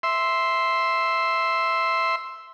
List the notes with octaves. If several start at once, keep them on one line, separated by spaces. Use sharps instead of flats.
E5 C6